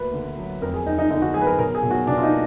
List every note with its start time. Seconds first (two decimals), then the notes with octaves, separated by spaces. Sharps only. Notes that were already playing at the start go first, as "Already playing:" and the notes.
Already playing: D2 A#3 B4
0.13 D3
0.38 F#3
0.62 F2 A#4
0.74 G#4
0.86 F2 D#4
0.98 D#4
1.10 D3 D#4
1.22 F#4
1.34 F#3 G#4
1.41 B4
1.47 A#4
1.58 B1 A#4
1.75 G#4
1.83 B1
1.91 F#4
2.07 B2 D4
2.18 F4
2.23 D#4
2.31 A#3